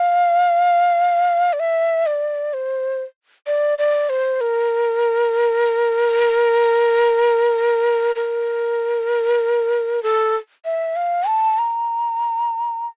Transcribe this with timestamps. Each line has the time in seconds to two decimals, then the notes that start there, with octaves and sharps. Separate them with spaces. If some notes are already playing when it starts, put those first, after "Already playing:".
Already playing: F5
1.53 D5
1.60 E5
2.06 D5
2.54 C5
3.47 D5
3.78 D5
4.09 C5
4.41 A#4
8.16 A#4
10.03 A4
10.65 E5
10.96 F5
11.27 A5
11.58 A#5